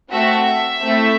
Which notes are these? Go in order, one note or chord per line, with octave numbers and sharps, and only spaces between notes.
A3 C4 F#4 A4 E5
A3 C4 E4 A4